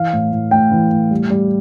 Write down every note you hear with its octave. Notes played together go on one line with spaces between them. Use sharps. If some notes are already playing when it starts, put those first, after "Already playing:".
Already playing: E3 F5
A2
A2
A2 G5
E3
A2
G3
G3